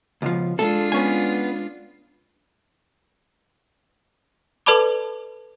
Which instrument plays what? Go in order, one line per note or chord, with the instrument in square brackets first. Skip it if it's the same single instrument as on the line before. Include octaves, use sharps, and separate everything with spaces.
[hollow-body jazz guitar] C#2 B2 F3
[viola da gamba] G#3 D4 F4 [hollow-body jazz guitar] A4
[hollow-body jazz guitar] B3 C#4 G#5
[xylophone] A4 B4 D5 A5 B5 D6